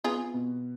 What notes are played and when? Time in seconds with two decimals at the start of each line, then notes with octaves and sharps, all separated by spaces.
0.04 B3 F4 G#4
0.34 B2